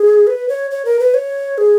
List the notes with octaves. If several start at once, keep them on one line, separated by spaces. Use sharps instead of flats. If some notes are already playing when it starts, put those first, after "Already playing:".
Already playing: G#4
B4
C#5
C#5
A#4
B4
C#5
G#4